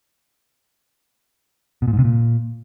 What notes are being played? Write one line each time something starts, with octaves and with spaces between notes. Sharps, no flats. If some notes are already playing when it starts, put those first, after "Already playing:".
B2
A#2
G#2
C3
A#2